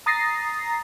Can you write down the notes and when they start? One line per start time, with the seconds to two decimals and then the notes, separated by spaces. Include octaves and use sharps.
0.06 A#5 D#6 A6 A#6 C7